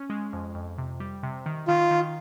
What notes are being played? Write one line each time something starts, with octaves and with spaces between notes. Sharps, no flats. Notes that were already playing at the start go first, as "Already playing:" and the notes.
Already playing: C#4
G#3
F2
F2
C3
G3
C3
D#3
D#3 F4
D#3